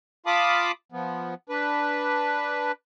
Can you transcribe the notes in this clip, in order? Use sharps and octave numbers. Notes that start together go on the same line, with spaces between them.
F4 F5 A5 B5 D6 D#6
F3 B3
D4 B4